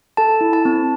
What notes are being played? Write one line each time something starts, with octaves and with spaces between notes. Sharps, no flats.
A4 A5
E4
A5
C4